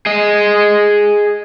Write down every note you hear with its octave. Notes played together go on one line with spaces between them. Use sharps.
G#4 D#5